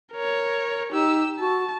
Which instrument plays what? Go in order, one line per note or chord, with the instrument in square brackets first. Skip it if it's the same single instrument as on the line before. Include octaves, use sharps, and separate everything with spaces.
[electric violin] A#4 C#5
[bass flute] D#4 [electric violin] G4 E6
[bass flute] F#4 [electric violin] A5